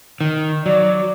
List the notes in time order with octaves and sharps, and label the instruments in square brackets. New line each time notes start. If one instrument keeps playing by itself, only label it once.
[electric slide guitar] D#3
[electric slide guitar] F#3 [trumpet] D5